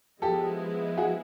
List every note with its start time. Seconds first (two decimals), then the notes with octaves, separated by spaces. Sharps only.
0.22 F3 G#3 B3 E4 G4 A4
0.98 F#4 G#4